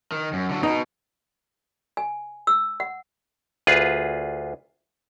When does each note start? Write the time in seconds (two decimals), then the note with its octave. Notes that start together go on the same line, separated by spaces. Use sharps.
0.12 D#3
0.33 F#2
0.50 D3 F#3
0.63 B2 D#4
1.97 G#5
2.47 E6
2.80 F#5
3.67 D2 F4 G#4 B4